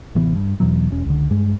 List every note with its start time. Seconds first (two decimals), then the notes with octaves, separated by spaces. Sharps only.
0.15 A1 C3 E3 B3
0.35 G2
0.60 E2 B2 E3 F#3
0.91 E1 C#4
1.05 C#2 D3
1.30 G2 G#3